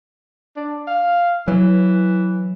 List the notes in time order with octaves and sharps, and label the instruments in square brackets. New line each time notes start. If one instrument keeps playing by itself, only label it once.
[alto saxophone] D4
F5
[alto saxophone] E3 [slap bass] F#3